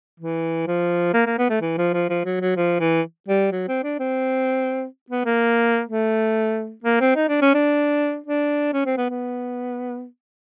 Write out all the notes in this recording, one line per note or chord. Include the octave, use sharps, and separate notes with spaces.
E3
F3
A#3
A#3
B3
A3
E3
F3
F3
F3
F#3
F#3
F3
E3
G3
F#3
C4
D4
C4
B3
A#3
A3
A#3
C4
D#4
D4
C#4
D4
D4
C#4
C4
B3
B3